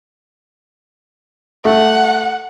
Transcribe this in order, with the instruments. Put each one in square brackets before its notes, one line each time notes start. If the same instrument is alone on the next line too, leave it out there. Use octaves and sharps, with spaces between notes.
[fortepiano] A3 [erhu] F#5